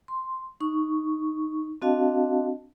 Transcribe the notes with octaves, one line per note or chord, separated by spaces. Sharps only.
C6
D#4 C#6
C4 D4 F#4 D#5 F5 A5